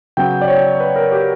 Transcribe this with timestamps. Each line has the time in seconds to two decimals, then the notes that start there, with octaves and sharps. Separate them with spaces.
0.17 C#3 F#3 B3 G5
0.41 D5
0.48 C#5
0.80 B4
0.96 A#4
1.12 G4